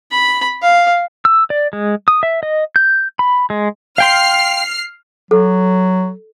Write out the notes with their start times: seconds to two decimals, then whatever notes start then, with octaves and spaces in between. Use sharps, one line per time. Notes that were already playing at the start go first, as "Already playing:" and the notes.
0.11 B5
0.63 F5
1.25 E6
1.50 D5
1.73 G#3
2.08 D#6
2.23 E5
2.43 D#5
2.76 G6
3.19 B5
3.50 G#3
3.98 F5 G5 C6 F6 C7
5.31 F#3 A4